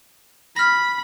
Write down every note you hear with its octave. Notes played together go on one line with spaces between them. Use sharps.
B5 F6 A#6